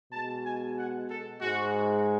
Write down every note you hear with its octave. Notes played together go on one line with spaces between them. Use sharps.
B2 G#3 A5
G#5
F#5
A4
G#2 G#3 F#4